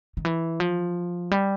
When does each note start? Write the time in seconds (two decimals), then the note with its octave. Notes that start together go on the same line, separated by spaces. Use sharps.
0.17 D#3
0.25 E3
0.60 F3
1.31 G3